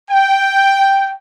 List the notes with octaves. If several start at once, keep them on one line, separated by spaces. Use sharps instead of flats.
G5